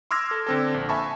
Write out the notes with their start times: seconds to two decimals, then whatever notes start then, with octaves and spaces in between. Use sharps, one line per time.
0.11 C6 D6 E6 F6 G#6 A#6
0.31 A4
0.47 D3 C4 A4
0.74 A#1
0.89 E5 G#5 A5 B5 C#6